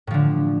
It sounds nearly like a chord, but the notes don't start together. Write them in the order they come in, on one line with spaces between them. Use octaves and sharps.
A2 F3 D3